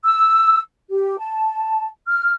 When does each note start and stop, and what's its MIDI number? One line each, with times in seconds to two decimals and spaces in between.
0.04 0.59 88
0.91 1.17 67
1.19 1.87 81
2.07 2.32 89